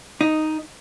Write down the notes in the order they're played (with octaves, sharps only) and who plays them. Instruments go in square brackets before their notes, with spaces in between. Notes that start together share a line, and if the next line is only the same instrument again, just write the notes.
[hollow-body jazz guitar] D#4